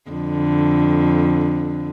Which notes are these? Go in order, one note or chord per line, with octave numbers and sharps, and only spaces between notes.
F2 D3